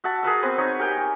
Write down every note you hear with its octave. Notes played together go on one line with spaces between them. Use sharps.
F#4 E5 F#5 A5
G#4 A#4 B4 E5
B3 C4 B4
D#4 C#5
G4 A#4 G5 G#5
G4